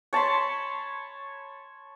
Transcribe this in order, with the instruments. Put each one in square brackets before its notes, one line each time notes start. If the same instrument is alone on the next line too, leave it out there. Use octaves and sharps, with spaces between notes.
[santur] C#5 A5 B5 C6